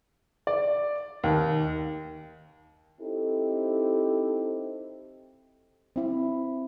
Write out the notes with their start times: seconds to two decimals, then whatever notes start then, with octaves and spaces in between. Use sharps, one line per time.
0.47 D5
1.24 D#2
3.00 C4 D#4 E4 G4 A4
5.96 C4 E4